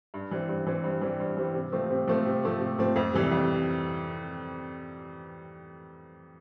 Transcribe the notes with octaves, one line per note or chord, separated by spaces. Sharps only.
G2
E3 G3 C4
G2
E3 G3 C4
G2
E3 G3 C4
G2
E3 G3 C4
C3
F3 A3 C4
C3
F3 A3 C4
C3
F3 A3 C4
C3
F3 A3 C4
F2
C3 E3 G3
F2